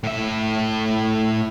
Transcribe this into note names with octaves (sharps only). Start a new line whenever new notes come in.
A2 E5